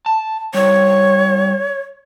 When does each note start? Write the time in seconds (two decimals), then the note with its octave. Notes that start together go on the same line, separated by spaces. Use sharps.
0.06 A5
0.54 G3 E4 C#5